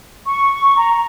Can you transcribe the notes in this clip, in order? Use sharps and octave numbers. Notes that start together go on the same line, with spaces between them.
C#6
A#5